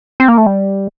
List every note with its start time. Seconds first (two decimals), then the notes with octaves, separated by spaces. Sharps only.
0.20 C4
0.28 A#3
0.38 A3
0.46 G3